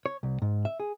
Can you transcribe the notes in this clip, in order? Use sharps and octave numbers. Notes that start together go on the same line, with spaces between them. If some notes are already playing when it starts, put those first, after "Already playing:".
C#5
C2
G#2
E5
G#4